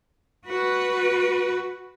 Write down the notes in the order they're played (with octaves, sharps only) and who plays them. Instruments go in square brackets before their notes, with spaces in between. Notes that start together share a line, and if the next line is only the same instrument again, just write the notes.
[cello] F#4 B4